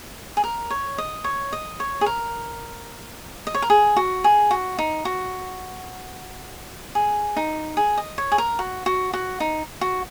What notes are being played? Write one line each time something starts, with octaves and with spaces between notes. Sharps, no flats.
G#4
A#4
C#5
D#5
C#5
D#5
C#5
G#4
A#4
D#5
C#5
A#4
G#4
F#4
G#4
F#4
D#4
F#4
G#4
D#4
G#4
D#5
C#5
G#4
A#4
F#4
F#4
F#4
D#4
F#4